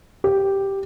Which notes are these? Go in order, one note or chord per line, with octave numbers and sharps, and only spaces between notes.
G4